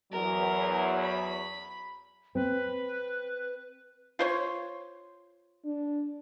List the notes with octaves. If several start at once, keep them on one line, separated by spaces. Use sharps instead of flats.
E2 F#3 A#4
B5
C4 B4
F4 C5 C#5
D4